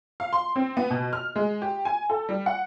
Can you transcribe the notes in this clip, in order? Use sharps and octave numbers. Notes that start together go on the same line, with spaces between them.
F5
C6
C4
B3
B2
F6
G#3
G4
G#5
A4
G3
F#5